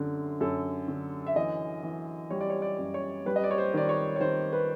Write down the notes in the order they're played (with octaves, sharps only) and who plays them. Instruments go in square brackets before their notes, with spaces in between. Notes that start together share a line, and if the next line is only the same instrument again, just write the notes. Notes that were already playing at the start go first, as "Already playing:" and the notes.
Already playing: [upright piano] F#2 D3
F#2 A4
D3
E5
E3 D#5
E3
G3 C#5
D5
C#5
D5
F#2
C#5
G3 B4
D#5
D5
C#5
C5
D#3 D5
C#5
C#5
D#3 C5
B4